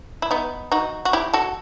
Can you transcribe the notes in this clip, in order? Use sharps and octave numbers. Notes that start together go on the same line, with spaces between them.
E4
B3 D#4
D#4 F#4
F#4
E4 G4
F#4 A4